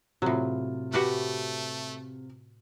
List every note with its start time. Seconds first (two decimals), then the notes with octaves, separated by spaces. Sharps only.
0.22 A2 C3 F#3 F4
0.93 A3 F#4 G4 B4